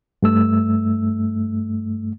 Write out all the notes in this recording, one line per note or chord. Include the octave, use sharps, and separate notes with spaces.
G2 A3 E6